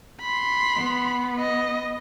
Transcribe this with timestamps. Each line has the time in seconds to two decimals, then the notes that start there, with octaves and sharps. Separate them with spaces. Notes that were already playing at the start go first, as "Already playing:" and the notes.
0.21 B5 C6
0.76 B3
1.39 D#5